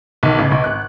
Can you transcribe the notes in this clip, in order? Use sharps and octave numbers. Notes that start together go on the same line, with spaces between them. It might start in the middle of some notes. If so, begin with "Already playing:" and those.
B1 D#3
A1 C#3
B1
G#1 F#6